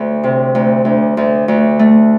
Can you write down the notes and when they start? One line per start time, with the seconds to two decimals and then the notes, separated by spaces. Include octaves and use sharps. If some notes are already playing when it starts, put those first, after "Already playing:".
Already playing: D2
0.24 C3
0.55 D2
0.85 D2
1.17 D2
1.48 D2
1.79 A3